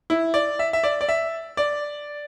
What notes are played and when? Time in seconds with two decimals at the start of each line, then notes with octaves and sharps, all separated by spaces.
0.10 E4
0.34 D5
0.59 E5
0.73 E5
0.84 D5
1.01 D5
1.09 E5
1.57 D5